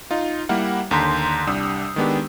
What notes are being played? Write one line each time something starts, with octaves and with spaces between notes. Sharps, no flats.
D#4 F4
G3 A#3 E4 A#4 F#5
D#2 D3 A#5 C6 G6 B6
C2 G3 D4 D#6 E6
D#3 G#3 B3 D4 G4